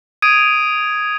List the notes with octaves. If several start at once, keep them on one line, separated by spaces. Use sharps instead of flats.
D#6 G#6 D7 D#7